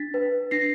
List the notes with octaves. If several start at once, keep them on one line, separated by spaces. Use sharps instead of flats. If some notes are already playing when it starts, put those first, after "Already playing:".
Already playing: D4 A6 B6
B4
D4 A#6 C7